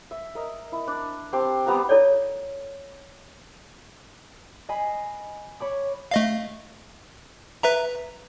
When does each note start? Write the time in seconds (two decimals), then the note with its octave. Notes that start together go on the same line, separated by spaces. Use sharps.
0.11 E5
0.35 A#4 D#5
0.72 E4
0.87 D4
1.33 C4 G4 A5 C6
1.66 G3 B3 A5 A#5
1.89 E4 A4 C#5 D5
4.69 D#5 G#5 B5 C7
5.60 C#5 B5 D6
6.11 A3 D#5 F5
7.63 B4 E5 A#5